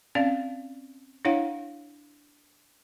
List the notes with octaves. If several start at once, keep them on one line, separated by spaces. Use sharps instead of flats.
C4 C#4 D5 F5
D4 E4 C#5 F5 F#5